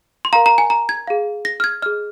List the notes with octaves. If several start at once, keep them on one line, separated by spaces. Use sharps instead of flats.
C6
A#4 F5 A#5
A#5
G#5
A#5
G#6
G#4 F5
A#6
F6
G#6
G#4 D#5 F6